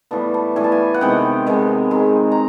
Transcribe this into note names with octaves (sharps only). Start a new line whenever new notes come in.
A2 E3 G3 B3 A5
A5
A2 E3 G3 B3 G#5
A5
G#5
F#5
C3 D#3 G#3 B3 G5
C3 D#3 G#3 B3
D#3 G#3 C4 D#4
A#5